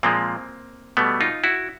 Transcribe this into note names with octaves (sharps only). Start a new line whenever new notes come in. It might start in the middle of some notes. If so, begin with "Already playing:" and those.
A#2 F3 G#3 A#3 C4
B2 G3 A3 B3
D#4 F4
E4 F#4